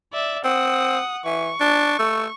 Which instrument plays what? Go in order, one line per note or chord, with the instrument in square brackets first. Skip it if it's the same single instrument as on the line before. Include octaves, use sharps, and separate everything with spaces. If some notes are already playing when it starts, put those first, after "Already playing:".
[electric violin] D5 E5
[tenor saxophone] C4 [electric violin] F#5 D#6
[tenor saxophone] E3 [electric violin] C#6
[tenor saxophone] D4
A3